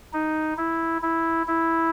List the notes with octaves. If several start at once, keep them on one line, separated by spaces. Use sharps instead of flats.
D#4
E4
E4
E4